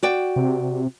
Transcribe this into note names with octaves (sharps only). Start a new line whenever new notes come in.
F#4 D5 G5
C3